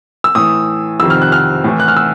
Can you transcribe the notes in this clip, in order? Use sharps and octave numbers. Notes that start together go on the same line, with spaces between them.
E6
A2 E3 D#6
F2 C3 D#3 E6
F6
F#6
F6
A2 E3
F#6
F6
E6